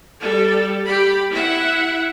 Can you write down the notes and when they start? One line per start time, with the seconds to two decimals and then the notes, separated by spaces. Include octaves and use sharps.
0.20 G3 A4
0.85 G4 B5
1.31 E4 E5 F#5